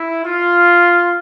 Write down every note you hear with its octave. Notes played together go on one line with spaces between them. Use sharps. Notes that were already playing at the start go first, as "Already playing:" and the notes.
Already playing: E4
F4